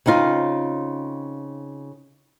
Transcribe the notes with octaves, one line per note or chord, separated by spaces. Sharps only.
C#3 C4 D#4 F4